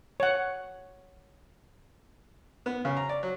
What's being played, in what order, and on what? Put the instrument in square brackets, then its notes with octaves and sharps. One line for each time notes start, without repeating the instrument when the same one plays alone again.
[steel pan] C#5 F#5
[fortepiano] B3
C#3
A#5
D5
F#3